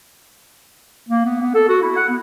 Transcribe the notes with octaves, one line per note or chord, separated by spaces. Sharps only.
A#3
B3
B3
A4
F#4
E4
F#5
B3